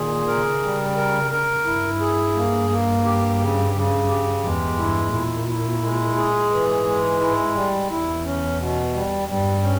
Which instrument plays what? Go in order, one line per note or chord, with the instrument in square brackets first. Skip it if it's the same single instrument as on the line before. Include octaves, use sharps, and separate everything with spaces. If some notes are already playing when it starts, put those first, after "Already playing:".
Already playing: [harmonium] A#2 G#4 [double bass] D#3
[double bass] C#3 [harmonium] A#4
[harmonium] G3
A#4
A#4
[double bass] G2 [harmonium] E4
[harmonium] G#4
A#3
A#3
G4
C#3
C#3
G4
[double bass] E2 [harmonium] G#3
[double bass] G2 [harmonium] E4
[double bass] A#2 [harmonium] E4
[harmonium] E4
G#3
G#4
[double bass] G#2 [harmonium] E3
[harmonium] G#3
E4
G3
[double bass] E2 [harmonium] E4
[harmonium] C#4
B2
G3
[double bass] G2 [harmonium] G3
[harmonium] C#4